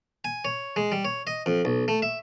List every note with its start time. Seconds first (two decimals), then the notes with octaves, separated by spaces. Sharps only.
0.24 G#5
0.45 C#5
0.76 G#3
0.92 G3
1.05 C#5
1.27 D#5
1.46 F2
1.65 B1
1.88 A3
2.02 E5